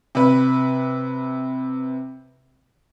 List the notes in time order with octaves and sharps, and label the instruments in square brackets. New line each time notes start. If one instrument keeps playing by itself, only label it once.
[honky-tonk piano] C3 B4